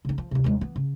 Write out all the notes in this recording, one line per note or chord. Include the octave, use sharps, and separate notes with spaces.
C#3 D#4
F3
D#2 C3
D#2 G#3
E3 B3
C#3